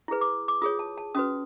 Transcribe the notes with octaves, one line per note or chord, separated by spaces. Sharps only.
E4 G#4 B4
D6
D6
F4 G#4 C#5 D#6
A5
A5
C#4 F#4 B4 D#6